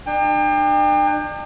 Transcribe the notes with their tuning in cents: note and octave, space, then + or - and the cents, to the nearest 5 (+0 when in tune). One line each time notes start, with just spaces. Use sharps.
D4 +45 G5 +35